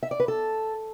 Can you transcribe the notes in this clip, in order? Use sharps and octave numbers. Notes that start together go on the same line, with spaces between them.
E5
D5
B4
A4